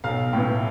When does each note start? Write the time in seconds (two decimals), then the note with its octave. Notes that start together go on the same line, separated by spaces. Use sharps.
0.04 B1 F5
0.33 A2 E3 G5